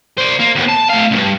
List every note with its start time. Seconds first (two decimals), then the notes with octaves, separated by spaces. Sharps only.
0.18 C5 D5
0.39 A#3
0.55 D#2 B3
0.68 A5
0.89 A2 F5
1.11 C#2 G2